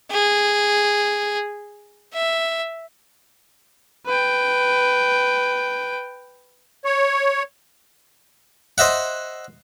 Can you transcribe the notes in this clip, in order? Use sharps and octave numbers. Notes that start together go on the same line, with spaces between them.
G#4
E5
B4 G5
C#5
C5 D#5 E5 F#5